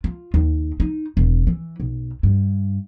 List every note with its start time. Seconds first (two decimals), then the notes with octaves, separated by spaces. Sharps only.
0.04 F4
0.34 D#2
0.80 D#4
1.17 E1
1.47 E3
1.80 B1
2.23 G2